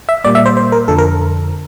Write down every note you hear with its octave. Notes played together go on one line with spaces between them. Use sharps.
E5
A#2 G3 A#3 D5
E5
C5
C5
A#4
F2 D3 F3 A4
A#4